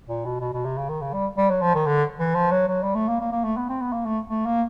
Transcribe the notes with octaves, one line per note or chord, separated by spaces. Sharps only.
A#2
B2
B2
B2
C3
C#3
D#3
C#3
G3
G3
F#3
F3
D#3
D3
E3
F3
F#3
F#3
G3
A3
A#3
A#3
A#3
A3
B3
C4
B3
A#3
A3
A3
A#3